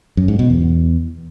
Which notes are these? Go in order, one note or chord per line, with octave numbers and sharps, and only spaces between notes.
F#2
G#2
B2
E2